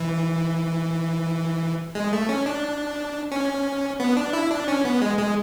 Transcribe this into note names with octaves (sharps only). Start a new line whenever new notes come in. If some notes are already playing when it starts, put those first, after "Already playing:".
Already playing: E3
G#3
A3
C#4
D4
C#4
B3
D4
E4
D4
C#4
B3
G#3
G#3